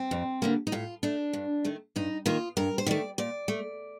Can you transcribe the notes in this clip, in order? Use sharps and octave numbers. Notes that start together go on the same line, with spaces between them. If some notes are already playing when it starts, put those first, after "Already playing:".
Already playing: C4
F2
D3 G3 A#3
D#4
A2 F4
A3 D4
G2
D#3 A3
G2 D#4
D#3 A#3 F4
G2 A#4
C5
D#3 A3 D5
A#2 D5
A3